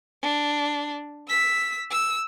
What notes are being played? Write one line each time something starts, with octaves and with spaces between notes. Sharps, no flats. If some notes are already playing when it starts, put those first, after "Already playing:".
D4
E6 B6
E6